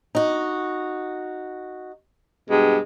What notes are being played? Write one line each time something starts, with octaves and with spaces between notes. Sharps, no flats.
D#4 F#4
G2 B2 G#3